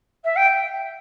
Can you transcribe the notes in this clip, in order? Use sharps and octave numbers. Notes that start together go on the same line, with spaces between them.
E5
G5